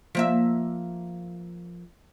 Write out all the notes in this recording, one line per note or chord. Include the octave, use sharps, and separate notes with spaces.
F3 A#3 E5